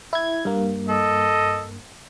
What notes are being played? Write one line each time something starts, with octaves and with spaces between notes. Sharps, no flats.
E4 G#6
G2 A#3
A4 D#5